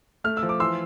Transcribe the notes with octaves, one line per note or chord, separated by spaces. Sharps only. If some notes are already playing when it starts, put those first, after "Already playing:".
A3 F6
E6
F3
D6
E3 C6 E6